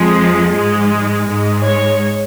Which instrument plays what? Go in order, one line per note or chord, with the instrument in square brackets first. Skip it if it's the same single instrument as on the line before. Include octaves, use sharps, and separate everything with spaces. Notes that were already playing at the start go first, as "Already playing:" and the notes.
Already playing: [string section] F2 F3 G#3
G#2 G#3
G#2 G#3
C#5